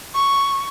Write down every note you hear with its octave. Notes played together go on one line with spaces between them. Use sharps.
C#6